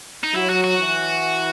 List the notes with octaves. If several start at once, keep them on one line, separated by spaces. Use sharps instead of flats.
D#4
F#3 E4
F#4
F#4
E3